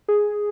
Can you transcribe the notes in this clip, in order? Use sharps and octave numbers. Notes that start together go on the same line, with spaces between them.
G#4